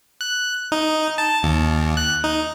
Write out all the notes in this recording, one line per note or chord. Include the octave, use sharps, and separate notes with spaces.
F#6
D#4
A5
D#2
F#6
D#4